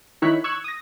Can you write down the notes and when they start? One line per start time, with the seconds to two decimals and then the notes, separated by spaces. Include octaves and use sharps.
0.22 D#3 D#4 E4 C#5 F#6 B6
0.44 C#6 E6 F#6 G#6
0.64 D#6 A#6